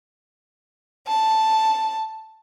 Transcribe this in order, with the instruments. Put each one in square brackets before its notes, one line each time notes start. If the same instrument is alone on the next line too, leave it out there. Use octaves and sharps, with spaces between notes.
[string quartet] A5